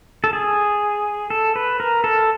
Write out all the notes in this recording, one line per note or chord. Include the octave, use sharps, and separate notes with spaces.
A4
G#4
A4
B4
A#4
A4